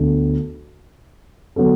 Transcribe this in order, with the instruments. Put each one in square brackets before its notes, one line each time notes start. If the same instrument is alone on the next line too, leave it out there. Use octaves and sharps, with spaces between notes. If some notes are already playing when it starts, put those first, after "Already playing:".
Already playing: [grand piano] D2 D3 B3
D3 F#3 B3 D4 A4